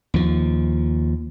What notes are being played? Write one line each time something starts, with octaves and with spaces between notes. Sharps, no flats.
D#2 F3